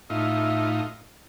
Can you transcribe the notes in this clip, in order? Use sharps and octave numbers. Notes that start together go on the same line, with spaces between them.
A2 D#4 F4 E5